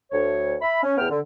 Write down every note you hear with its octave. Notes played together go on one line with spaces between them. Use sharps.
D2 C#5
E5 B5
C#4
E2 A2 B3 G5 F6
D3